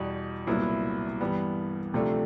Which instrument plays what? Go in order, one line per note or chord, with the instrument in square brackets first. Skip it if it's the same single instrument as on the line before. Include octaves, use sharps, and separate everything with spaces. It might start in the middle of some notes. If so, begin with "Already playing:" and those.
Already playing: [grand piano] E2 B2 G3
C2 A#2 F#3 B3 E4
G2 E3 G3 B3
D2 C3 F3 A3 D4